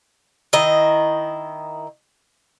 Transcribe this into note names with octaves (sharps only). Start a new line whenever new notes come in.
D#3 E4 D#5